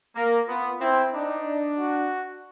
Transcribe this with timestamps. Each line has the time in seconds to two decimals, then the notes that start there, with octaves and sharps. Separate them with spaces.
0.16 A#3 A#4
0.48 B3 F4
0.81 C4 E4
1.13 D4 D#4
1.79 F#4